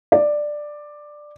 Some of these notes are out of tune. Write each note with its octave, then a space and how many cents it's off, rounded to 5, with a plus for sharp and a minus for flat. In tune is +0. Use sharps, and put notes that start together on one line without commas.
D5 +10